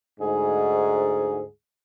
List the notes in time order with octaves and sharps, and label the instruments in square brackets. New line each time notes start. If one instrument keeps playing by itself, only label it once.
[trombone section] D2 G#2 [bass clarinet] G#4